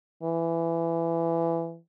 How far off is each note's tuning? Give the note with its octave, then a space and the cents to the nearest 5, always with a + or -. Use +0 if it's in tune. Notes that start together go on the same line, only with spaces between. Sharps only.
E3 +20